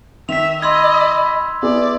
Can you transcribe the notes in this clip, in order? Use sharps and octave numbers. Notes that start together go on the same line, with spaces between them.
D#3 E5 B6 F7
D#5 B5 C6 E6 G#6
B3 E4 G#4 D5